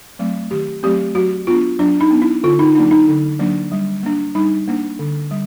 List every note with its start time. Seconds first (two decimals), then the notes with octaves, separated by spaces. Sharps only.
0.19 F#3 A3 C4
0.51 D#3 G4
0.83 F#3 A3 C4 G4
1.15 F#3 F#4
1.47 B3 D4 F4
1.79 F#3 D4
2.01 D#4
2.11 B3 D4
2.22 E4
2.44 D3 F4
2.59 D#4
2.75 F#3 A#3 D4 D#4
2.91 D#4
3.08 D3
3.39 F#3 A#3 D4
3.72 G3
4.03 A#3 D4
4.35 G3 D#4
4.68 A#3 D4
4.99 D3
5.31 G3